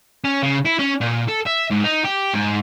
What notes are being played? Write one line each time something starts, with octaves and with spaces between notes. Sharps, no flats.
C#4
C#3
E4
C#4
A#2
A4
E5
G#2
D#4
G4
G#2